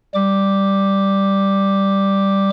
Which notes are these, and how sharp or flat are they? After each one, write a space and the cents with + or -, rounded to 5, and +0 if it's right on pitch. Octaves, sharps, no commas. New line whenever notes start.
G3 +0 D6 +0